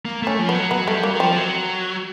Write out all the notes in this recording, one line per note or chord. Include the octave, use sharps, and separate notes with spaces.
A#3
A3 C#4
F3
B3
F#3
F#3 B3
G3 A3
F#3 A#3
F3 C4
F#3